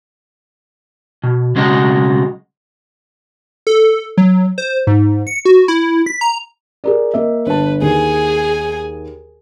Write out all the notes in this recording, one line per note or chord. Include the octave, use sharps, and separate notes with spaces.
B2
B1 C#3 G#3 F#4 D#5
A4
F#3
C5
G#2
C#7
F#4
E4
B6
A#5
G#4 A#4 D5
A#3 D#5 E5
G1 B4 A5
D#2 G#4 G#5